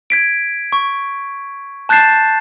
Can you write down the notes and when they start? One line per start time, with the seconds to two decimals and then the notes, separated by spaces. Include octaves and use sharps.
0.10 G#6 B6 D7
0.72 C#6
1.89 A5 F#6 G6 A6 C7 E7